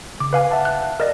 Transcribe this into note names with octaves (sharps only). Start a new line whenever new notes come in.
C#3 D6
B4 F5 G#5
E5 F#5 A5
F#6
A#4 D5 D#5